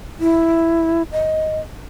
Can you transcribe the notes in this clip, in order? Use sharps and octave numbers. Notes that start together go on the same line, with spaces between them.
E4
D#5